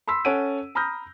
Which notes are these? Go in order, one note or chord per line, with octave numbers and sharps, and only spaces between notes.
B5 C6 E6 B6
C#4 A4 F#5 D7 D#7
A#5 B5 D#6 F6 G6 A#6